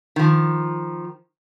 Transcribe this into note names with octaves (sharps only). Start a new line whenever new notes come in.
D#3 F3